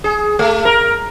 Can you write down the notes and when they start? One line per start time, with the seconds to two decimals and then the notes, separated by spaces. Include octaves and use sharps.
0.04 G#4
0.39 A3
0.65 A#4